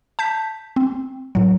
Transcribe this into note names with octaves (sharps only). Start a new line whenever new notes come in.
A5 G6 B6
C4
A2 F#3